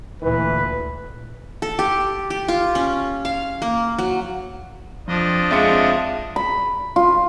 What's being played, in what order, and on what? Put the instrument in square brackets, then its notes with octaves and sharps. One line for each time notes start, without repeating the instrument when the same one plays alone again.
[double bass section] D2 A#2 [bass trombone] E3 [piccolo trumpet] B4
[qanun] A4
G4
G4
F4
C#4
F5
A#3
F#3
[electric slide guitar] F2 [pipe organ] F3 D4 D#5
[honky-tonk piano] F2 G#3 C#7 [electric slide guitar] D5 E5 F5
[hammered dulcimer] B5
F4